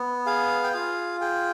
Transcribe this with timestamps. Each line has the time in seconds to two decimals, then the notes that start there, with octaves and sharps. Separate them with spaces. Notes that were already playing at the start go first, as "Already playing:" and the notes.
Already playing: B3
0.26 G#4 F5
0.63 G5
0.74 F4 F5
1.21 G#4 G5